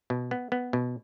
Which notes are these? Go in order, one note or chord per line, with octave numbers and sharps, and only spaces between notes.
B2
B3
B3
B2